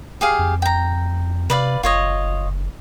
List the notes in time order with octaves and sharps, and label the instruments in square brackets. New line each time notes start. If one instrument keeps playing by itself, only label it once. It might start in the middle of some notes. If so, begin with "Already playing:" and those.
[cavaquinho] G4 G#4 F5
[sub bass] F2
[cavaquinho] G5 A#5
[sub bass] C3 [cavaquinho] B4 D5 F5
[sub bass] F#1 [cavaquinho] F4 C#5 D#5